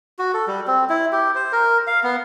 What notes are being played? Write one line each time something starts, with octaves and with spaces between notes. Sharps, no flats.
F#4
A4
G3
C4
E4
G4
C5
A#4
F5
B3